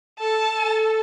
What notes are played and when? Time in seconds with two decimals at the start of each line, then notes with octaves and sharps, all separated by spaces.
0.19 A4 A5
0.57 A4